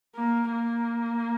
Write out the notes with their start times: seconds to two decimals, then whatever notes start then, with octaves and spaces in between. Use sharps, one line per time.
0.16 A#3
0.52 A#3